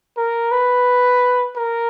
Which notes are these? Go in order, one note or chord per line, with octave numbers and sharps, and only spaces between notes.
A#4
B4
A#4